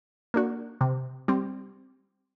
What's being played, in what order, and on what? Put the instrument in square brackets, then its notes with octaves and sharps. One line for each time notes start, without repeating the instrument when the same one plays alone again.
[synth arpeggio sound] A#3 D4 F#4
C3
G3 C4